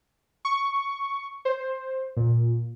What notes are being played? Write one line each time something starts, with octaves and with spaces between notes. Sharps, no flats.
C#6
C5
A#2